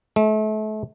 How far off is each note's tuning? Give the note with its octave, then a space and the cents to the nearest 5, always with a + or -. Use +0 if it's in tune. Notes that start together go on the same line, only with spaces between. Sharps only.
A3 -35